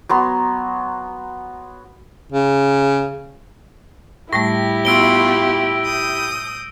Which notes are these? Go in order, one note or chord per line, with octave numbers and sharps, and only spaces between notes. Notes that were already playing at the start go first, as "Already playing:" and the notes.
F#3 B3 C6
C#3
A2 G3 A3 E4 G4 A#6
B3 F4 F#4 E6 D7 G7
D#6 G6